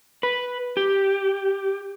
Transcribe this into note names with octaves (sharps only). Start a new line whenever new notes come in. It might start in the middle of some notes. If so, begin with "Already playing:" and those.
B4
G4